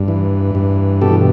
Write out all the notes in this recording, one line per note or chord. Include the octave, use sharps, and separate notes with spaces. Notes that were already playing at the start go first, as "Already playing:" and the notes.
Already playing: G2
E3
G2
B2 G4 A4